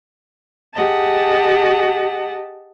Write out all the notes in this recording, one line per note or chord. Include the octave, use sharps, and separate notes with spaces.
G4 G#4 D#5 F#5 A5